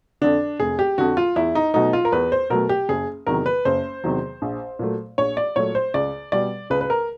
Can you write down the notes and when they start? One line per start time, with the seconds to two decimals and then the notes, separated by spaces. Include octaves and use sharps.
0.21 F2 D3 D4
0.59 F1 G#4
0.79 G4
0.98 F2 D3 F#4
1.17 F4
1.36 E2 E4
1.55 D#4
1.74 B2 F#3 A3 D#4
1.93 F4
2.05 A#4
2.12 E2 B4
2.32 C5
2.50 B2 F#3 A3 A#4
2.69 G4
2.89 F#1 G#4
3.27 E2 C3 D#3 F#3 A#4
3.46 B4
3.65 F#1 C5
4.04 E2 C3 D#3 F#3
4.42 A#1
4.79 A#2 F#3 A3
5.18 A#1 C#5
5.37 D5
5.56 A#2 F#3 A3 C#5
5.75 C5
5.94 C#2 D5
6.32 B2 G3 D5
6.70 C#2 B4
6.81 B4
6.90 A#4